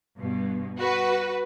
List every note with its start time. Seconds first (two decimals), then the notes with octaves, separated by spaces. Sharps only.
0.19 G2 B2
0.78 F#4 B4